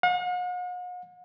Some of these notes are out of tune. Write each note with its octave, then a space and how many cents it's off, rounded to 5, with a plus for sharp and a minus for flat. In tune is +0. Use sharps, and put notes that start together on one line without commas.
F#5 -45